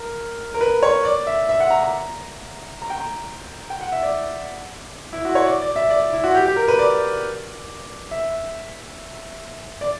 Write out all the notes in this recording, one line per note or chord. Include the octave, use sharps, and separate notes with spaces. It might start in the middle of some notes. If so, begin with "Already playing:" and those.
Already playing: A#4
A#4
B4
C#5
D5
E5
E5
F#5
A#5
A#5
A#5
G5
A#5
G5
F#5
E5
D5
E4
F#4
C#5
D5
D5
E5
D5
E4
F#4
G4
G4
A#4
B4
D5
E5
D5